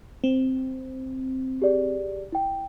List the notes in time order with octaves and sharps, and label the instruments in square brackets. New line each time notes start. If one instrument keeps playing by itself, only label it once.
[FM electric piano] C4
[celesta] G4 G#4 D5
E4 G5